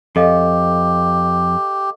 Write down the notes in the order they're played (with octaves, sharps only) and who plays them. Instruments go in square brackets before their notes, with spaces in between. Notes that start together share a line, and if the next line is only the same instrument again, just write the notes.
[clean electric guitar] F2 [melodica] G4 [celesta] A4 D#5 F5